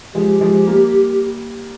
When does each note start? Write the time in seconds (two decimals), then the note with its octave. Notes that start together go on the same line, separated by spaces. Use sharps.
0.14 F3 G#3 G4
0.41 F3 G#3
0.67 G3 A#3